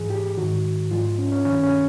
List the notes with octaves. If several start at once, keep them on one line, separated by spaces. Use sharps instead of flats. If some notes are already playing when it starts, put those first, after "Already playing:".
Already playing: G#2 E3 G#4
G4
G#2 D#3 F#4
G#2 F3 F4
C#4
C#4
G2 D#3 C#4
C#4